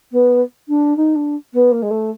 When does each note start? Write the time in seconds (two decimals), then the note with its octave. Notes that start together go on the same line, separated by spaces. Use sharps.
0.12 B3
0.68 D4
0.96 D#4
1.15 D4
1.53 B3
1.71 A#3
1.82 G#3
1.91 A3